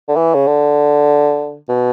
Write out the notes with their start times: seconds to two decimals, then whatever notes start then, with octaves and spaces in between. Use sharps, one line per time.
0.09 D3
0.16 E3
0.34 C#3
0.47 D3
1.69 B2